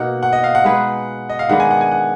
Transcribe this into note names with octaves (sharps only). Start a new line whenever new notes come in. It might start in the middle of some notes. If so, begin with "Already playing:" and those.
Already playing: B2 A#3 D#4 F#5
F#5
D#5
F5
F#5
G#3 D#4 G#4 B4
D#5
F5
D#3 G#3 B3 D4 F#5
G#5
F#5
G#5
F#5